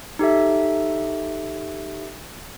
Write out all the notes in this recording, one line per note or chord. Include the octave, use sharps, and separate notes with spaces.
D#4 G4 A4 E5